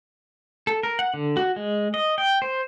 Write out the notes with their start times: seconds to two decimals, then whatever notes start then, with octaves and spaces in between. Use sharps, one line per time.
0.67 A4
0.83 A#4
0.99 F#5
1.14 D3
1.37 F#4
1.56 G#3
1.94 D#5
2.18 G5
2.42 C5